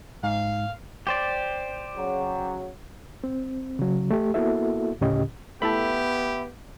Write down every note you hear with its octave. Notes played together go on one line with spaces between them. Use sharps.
G#2 F5
G4 C5 D5
C#3 F#3
C4
C#3 F#3
A3 G4
A#3 B3 E4 F#4 A4 E5
D2 A2 C#3 C#4 G4 D#5
A3 B3 E4 G4 A4 E5 B5